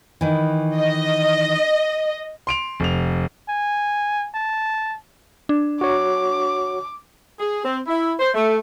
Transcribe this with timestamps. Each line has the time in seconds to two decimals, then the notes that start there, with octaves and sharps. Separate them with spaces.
0.21 D#3 E3
0.77 D#5
2.47 C6 D7 F7
2.80 F1 F7
3.49 G#5
4.34 A5
5.49 D4
5.81 F#4 C#5 D6
7.39 G#4
7.63 C4
7.87 E4
8.19 C5
8.34 A3